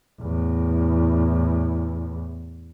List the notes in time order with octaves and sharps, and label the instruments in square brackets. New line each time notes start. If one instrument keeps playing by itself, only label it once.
[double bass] E2 A2